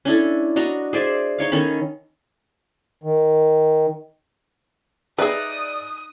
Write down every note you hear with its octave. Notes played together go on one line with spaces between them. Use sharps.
C#4 D4 E4 A4
D4 F#4 D#5 A#5
G#4 C5 D5 E5
D#4 C#5 F5
D#3 C#4 A4 B5
D#3
D#4 G#4 B4 D5 E5 D#6 F#6